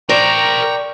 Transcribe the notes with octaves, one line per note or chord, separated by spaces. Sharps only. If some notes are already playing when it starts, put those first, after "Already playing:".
A#4 C5 D5 G5 A#5 C#6